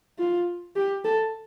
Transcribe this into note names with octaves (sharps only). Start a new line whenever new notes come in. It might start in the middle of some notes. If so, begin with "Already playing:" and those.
F4
G4
A4